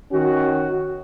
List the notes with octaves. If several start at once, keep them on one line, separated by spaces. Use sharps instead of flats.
D#3 C#4 F#4